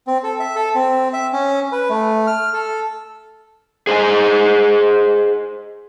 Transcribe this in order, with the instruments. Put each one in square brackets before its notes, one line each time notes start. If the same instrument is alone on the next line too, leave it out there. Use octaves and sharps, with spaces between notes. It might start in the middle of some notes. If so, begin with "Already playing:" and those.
[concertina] C4
A4
E5
A4
C4
E5
C#4
B4
A3
F6
A4
[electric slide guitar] G#4 C5 D#5 G#5